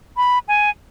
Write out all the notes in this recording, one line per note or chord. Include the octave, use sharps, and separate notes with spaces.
B5
G#5